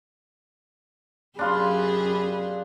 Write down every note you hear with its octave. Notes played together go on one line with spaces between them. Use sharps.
F#2 D4 F4 G4 G#4 B5 C6